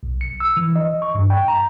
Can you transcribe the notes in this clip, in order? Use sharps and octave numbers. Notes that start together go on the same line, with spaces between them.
B1
C#7
E6
E3
D#5
C#6
G2
G5
A#5